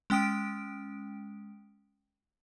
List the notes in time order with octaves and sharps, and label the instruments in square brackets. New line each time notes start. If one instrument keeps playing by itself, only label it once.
[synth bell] G#3 C#4 G5 D#6 D7